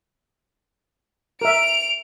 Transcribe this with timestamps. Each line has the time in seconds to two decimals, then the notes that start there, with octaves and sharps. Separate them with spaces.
1.41 A#4 E5 D7 F7